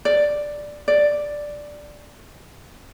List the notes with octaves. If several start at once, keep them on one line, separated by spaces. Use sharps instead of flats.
D5
D5